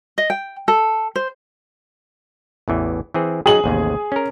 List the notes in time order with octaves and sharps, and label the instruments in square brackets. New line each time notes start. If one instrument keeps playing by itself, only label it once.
[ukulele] D#5
G5
A4
C5
[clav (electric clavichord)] A1 E2 E3
E3 C4 G#4
[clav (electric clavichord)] F#3 D#4 [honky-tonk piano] G#4 F#7
[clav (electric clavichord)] A1 D#2 C3
C#4 A#4